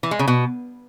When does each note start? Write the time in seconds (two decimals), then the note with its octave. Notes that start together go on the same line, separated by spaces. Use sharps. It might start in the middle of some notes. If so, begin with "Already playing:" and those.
0.03 E3
0.11 G#3
0.19 C#3
0.28 B2